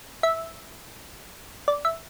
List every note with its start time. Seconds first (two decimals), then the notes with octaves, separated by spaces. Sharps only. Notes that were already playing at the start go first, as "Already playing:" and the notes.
0.23 E5
1.68 D5
1.85 E5